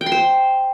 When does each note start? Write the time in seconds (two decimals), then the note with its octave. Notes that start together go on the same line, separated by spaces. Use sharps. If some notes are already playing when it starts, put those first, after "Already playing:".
0.01 G5
0.06 C6
0.12 C5